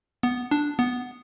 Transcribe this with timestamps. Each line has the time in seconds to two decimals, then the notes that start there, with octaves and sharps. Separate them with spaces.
0.23 B3
0.51 D4
0.79 B3